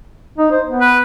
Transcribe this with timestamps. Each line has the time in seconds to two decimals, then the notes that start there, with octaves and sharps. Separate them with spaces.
0.38 D#4
0.51 C5
0.66 B3
0.80 B4